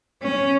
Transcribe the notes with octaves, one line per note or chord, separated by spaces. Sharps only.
C#4